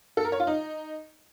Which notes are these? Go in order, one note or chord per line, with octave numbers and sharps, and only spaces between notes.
A4
A#4
C#5
F4
D#4